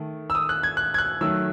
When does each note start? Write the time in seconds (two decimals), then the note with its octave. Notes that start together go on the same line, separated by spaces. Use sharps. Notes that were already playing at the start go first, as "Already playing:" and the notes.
Already playing: D#3 A3
0.30 E6
0.35 D#6
0.49 F#6
0.63 G#6
0.77 F#6
0.94 G#6
0.98 F#6
1.21 D#3 F#3 A3 E6